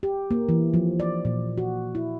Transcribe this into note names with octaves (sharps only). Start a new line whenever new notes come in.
G4
A#3
E3
F3
D5
A#2
F#4
E4